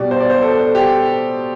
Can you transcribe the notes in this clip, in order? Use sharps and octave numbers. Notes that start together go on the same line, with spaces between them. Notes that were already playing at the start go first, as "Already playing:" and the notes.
Already playing: B2 G3 D5
C5
D5
C5
A4
G4